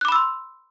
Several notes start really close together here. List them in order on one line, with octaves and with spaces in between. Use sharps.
F#6 D6 B5 E6 C6